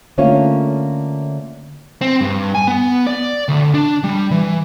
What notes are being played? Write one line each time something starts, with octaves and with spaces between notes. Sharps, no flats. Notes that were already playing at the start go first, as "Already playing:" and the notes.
D3 A3 A#3 C#4 F4 C#5
C4
G2
G#5
B3
D5
D2
D4
G3
E3